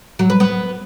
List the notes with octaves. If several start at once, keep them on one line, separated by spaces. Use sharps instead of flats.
F#3
B4
B3